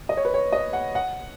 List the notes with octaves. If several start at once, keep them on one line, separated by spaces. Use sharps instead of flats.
D#5
C#5
B4
C#5
D#5
F#5
F#5